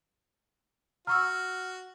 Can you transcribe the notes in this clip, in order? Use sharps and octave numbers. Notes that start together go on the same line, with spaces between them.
F#4 A#5 C#6 E6 F6